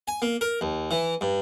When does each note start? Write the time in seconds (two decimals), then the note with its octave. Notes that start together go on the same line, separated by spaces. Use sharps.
0.08 G#5
0.22 A#3
0.41 A#4
0.61 D#2
0.91 E3
1.21 G2